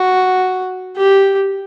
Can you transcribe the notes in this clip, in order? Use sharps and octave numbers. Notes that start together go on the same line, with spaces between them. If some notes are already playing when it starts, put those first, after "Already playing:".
Already playing: F#4
G4